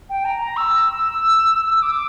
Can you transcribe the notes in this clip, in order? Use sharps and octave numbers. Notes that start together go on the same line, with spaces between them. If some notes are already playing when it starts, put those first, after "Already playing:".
G5
A#5
A#5
E6
D6